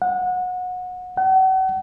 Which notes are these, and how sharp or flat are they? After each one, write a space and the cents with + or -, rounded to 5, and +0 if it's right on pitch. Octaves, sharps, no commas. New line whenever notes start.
F#5 -25
F#5 +40